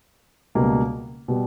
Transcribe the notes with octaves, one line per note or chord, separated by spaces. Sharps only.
C#2 B2 G3 A#3
B2 G3